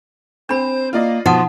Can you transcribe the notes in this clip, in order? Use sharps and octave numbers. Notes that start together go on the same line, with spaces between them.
C4 D4 C5 B5
A#3 F4 D5 D#5
B2 F3 D#4 F4 F#5 D#6